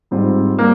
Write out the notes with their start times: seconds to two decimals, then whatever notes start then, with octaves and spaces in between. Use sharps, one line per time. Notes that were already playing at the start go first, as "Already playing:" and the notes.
0.11 G#2 G3 C4 F4
0.59 G3 A#3